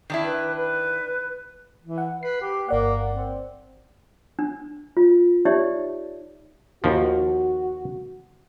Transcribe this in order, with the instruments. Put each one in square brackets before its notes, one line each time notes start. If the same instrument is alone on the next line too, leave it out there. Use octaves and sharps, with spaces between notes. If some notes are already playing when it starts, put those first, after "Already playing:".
[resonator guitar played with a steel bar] D#3 D4 E4
[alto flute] B4
B4
[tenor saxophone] E3
[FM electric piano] F#5
[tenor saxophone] B4 [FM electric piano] C7
[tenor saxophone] G4
[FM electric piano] G1 D5 F#5 [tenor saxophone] A#3
[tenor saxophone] C4
[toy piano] D4
F4
D#4 G4 C#5 D5 E5
[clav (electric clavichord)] D#2 F3 [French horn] F#4